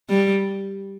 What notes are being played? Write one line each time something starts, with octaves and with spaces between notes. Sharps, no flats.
G3